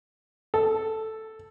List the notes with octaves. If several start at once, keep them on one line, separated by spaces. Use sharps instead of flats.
A4